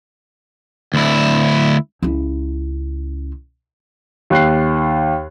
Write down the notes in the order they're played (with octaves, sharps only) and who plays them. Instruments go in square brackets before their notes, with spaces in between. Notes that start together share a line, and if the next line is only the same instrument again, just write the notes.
[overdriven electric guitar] D2 E4
[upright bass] C#2 E4
[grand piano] D#2 F#6 C7